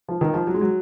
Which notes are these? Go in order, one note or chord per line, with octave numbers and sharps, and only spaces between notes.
F3
D#3
F3
F#3
G#3
F#3